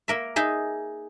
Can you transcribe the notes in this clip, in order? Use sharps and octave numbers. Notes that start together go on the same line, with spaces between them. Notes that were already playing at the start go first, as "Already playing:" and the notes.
A#3 A#4 E5
D#4 G#4 E5